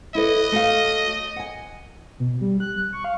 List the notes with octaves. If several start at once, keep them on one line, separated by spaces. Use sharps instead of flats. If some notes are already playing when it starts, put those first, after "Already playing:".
E4 A4 B4 D#5
A3 F#4 F5
F#5 G#5
B2
G3
F#6
C#6
F5